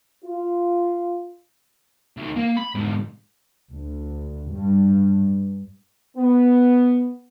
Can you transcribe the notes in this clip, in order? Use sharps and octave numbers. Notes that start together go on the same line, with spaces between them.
F4
D2 D#3
A#3 F5
B5
G#2 D3
D2
G2
B3